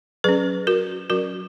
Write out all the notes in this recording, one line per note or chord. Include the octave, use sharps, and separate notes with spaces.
F#3 C#4 G#4 B4
F#4 A#4
F#3 C#4 F#4 A#4